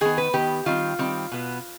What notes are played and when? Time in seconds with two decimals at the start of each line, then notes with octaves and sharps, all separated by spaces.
0.01 D#3 B3 G#4
0.18 B4
0.33 D#3 B3 G4
0.66 D#3 G3 C4 F4
0.99 D#3 G3 C4
1.32 B2 B3